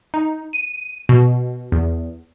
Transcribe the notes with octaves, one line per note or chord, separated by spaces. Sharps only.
D#4
D#7
B2
E2